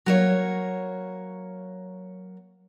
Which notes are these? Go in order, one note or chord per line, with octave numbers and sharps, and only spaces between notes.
F#3 A#3 C#5